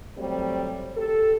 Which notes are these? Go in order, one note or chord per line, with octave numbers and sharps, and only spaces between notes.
F#3 G3 A3 C4
G4 A4